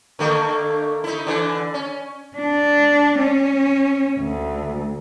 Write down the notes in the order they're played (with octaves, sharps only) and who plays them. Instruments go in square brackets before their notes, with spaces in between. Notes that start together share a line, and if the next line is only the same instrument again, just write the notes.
[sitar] D3 A3 A#3
D#4 E4
D3 E3
C#4
[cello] D4
C#4
D2